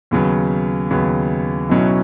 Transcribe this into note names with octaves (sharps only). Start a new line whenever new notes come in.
D#2 C#3 F#3 B3
D#2 C#3 F#3 B3
B1 B2 F#3 C#4 E4